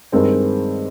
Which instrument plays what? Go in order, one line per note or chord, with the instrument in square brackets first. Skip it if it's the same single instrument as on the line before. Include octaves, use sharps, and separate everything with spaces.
[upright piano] G2 D#3 G#3 C4